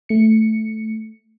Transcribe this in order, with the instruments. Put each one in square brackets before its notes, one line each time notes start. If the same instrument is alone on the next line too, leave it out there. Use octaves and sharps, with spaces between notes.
[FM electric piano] A3 C#7